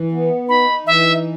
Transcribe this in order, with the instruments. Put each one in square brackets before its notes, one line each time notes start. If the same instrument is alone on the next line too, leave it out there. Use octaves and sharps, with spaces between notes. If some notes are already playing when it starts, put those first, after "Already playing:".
Already playing: [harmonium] E3
B3
[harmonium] D#4 [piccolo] B5
[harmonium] E3 [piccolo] E5